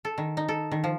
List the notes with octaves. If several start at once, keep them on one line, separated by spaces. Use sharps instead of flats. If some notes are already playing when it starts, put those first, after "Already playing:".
A4
D#3
D#4
A4
D#3
F3